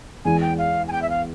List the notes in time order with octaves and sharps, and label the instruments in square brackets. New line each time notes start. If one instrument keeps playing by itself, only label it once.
[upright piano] E2 E3 G#3 [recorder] G#5
[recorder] G5
F5
G#5
G5
E5
F5